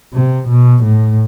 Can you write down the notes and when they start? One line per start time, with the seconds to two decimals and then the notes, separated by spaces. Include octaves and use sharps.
0.14 C3
0.49 B2
0.83 A2